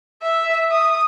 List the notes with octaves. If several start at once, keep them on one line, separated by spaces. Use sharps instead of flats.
E5
D#6